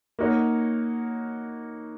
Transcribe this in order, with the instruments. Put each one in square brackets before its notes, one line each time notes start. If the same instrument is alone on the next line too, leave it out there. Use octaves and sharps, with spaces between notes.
[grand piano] A#3 D#4 F#4 C#5